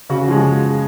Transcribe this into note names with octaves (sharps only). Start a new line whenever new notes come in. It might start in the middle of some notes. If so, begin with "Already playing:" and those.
C#3 F#4
F3 G#3